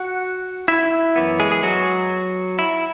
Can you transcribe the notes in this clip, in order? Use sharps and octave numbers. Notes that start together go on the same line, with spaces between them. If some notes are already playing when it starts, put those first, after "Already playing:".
Already playing: F#4 F#5
E4 E5
F#2 E3 B3
G#3 G#4
G#4
F#3 F#4
E4